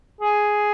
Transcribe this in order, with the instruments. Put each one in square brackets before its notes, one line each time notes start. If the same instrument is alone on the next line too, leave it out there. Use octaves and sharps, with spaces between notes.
[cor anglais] G#4